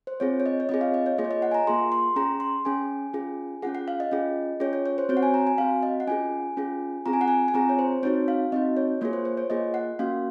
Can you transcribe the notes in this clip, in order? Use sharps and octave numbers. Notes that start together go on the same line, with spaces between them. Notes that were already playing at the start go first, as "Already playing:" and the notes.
C5
C4 F4 G#4 C#5
C#5
D#5
C#5
C4 F4 G#4 D#5
F5
D#5
C#5
A#3 F4 G#4 D#5
C#5
D#5
F#5
G#5
A#5
A#3 F4 G#4 C6
C6
C#4 G#4 A#5
C6
C#4 G#4 G#5
C#4 F4 G#4
C#4 F4 G#4 F#5
F#5
F5
D#5
C#4 F4 G#4
C#4 F4 G#4 C#5
C#5
C#5
C5
C4 F#4 C#5
F#5
G#5
A#5
G#5
C4 F#4 F5
D#5
F#5
C#4 F4 G#4 G#5
C#4 F4 G#4
C4 F4 G#4 A#5
G#5
F#5
G#5
G#5
C4 F4 G#4 A#5
C#5
C5
C4 D#4 F#4 C#5
F5
C4 D#4 F#4 D#5
C#5
A#3 F4 G#4 C#5
C5
C5
C#5
A#3 F4 G#4 D#5
F#5
A#3 C#4 F#4 F5